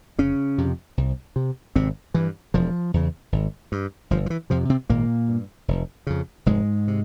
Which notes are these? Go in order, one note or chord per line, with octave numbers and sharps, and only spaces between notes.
F1 C#3 C#4
F2 C3
C2
C3
G#1 C3 C4
G2 E3
E1 F3
E2 C#3
G#1
G2
G1 F3
F3
E3
F2 C3 F3
C3 C4
G#1 A#2 A#3
G2
F1
F2 C#3
F1 G#2 G#3
C3